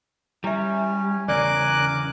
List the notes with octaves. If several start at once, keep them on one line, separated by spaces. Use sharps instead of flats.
G3 C#4 E4 E5
E2 C#3 A#4 D5 G#5 D6 F#6